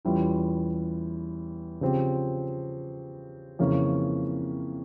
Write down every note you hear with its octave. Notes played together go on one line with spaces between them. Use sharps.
E2 E3 G3 C#4 F4
C#3 F3 C4 G4
F2 C#3 E3 A#3 C#4